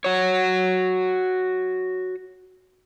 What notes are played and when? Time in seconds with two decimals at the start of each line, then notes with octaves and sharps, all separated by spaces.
0.04 F#4 C#5